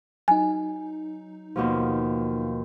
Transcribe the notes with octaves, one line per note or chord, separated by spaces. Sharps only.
F#3 D#4 G#5
D#2 B2 F3